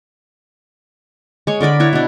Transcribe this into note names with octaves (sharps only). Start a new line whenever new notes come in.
G#3 C#5
D3 A#4 D5 B5
E4 B4 C#5
B2 D4